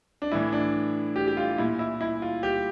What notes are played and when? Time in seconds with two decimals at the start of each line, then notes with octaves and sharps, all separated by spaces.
0.22 D4
0.32 A2 E3 E4
0.52 D4
1.16 G4
1.27 G4
1.37 F4
1.58 A#2 E4
1.79 E4
2.01 E4
2.22 F4
2.43 G4